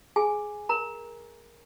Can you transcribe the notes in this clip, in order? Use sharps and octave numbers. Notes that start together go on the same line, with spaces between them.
G#4 G#5
A#4 A#5